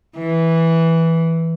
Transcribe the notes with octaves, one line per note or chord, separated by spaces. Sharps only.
E3